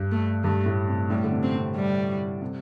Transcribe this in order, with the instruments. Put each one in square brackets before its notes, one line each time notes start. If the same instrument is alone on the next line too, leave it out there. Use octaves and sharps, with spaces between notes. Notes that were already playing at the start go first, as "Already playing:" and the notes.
Already playing: [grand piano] G2
[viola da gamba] A3
[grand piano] G2 [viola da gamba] A3
[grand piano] A2
C3
[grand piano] A2 [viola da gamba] G3
[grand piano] D3
C3
[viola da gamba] C4
[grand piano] C3
[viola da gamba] G3
[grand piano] C3